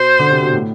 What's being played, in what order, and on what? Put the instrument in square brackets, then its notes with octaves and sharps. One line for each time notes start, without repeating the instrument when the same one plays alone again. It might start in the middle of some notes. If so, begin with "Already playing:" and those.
Already playing: [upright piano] B2 [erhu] C5
[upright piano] D3
C3
B2
A2